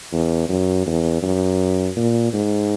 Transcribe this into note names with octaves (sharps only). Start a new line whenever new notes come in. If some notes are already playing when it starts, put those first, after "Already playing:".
E2
F#2
E2
F#2
A#2
G#2